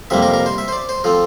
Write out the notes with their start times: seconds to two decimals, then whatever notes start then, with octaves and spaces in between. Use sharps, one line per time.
0.10 F2 C3 G3 A#3 E5
0.22 A#4
0.34 A#4
0.46 C5
0.58 E5
0.68 C5
0.73 D5
0.89 C5
1.04 F3 C4 A4